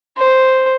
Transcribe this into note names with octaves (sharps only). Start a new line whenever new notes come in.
C5